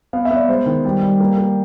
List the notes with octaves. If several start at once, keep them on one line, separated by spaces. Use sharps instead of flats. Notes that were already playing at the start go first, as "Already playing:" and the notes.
B3 F5
E5
B3
D5
G#3 C5
D#3
G3
G3
A#3
A#3